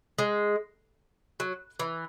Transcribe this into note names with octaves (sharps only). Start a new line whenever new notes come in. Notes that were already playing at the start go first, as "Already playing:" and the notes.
G#3
F#3
E3